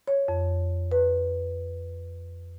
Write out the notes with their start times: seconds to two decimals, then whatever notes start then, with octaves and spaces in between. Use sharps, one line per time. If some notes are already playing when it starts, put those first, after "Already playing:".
0.08 C#5
0.28 F2
0.92 B4